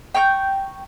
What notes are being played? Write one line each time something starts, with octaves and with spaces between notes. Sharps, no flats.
G5 A#5 C#6 G6